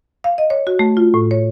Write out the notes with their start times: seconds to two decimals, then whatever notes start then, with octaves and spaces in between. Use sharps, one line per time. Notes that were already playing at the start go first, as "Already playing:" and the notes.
0.24 F5
0.38 D#5
0.50 C#5
0.67 F#4
0.79 A3
0.97 F4
1.14 A2
1.31 C#5